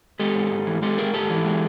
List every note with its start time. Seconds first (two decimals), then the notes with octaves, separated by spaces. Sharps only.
0.19 G#3 G4 A4
0.35 G#2
0.51 G#2
0.67 E3
0.82 G#3 G4 A4
0.98 G#2 G#4 A#4
1.14 G#2 G4 A4
1.30 E3
1.45 G#3